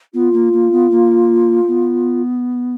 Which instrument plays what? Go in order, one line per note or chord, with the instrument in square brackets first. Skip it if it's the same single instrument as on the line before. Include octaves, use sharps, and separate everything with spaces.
[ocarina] B3 [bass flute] F4
[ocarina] A#3
A#3
B3
A#3
B3